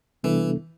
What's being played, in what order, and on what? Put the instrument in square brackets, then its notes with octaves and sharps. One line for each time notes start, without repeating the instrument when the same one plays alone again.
[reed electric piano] C3 G3 B3 D4 A4 [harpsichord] E3